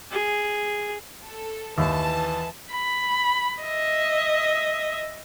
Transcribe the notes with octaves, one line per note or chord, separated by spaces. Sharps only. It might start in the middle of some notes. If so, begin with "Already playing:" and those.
G#4
A4
D#2 E3 A5
B5
D#5 E5